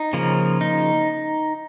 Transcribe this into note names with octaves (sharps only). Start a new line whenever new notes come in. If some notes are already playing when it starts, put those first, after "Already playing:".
Already playing: D#4
C#3 F3 A#3
D#4